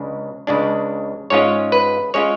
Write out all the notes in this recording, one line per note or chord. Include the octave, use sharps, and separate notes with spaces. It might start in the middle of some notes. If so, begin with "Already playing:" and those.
Already playing: C#2 C#3 G#3 D4
C#2 C#3 G#3 D4
G#2 G#3 C#4 F4 C#5
B4
G#3 C#4 F4 C#5